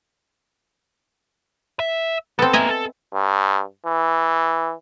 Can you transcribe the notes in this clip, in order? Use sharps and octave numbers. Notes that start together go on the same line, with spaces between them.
E5
B3 C4 A4
A#3 A4 D#5 E5 G#5
A4
G2
E3